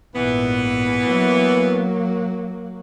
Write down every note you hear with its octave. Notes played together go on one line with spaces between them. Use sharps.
A#1 G#2 E3 B3
F#3 A#3